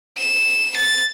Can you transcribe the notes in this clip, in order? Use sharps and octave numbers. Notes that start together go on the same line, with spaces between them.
E7
A6